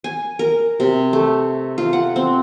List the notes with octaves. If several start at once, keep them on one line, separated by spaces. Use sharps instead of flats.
G#5
A#4
C3
A3
F4
F#5
C4